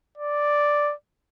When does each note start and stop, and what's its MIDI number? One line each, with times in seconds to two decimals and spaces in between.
0.18 0.93 74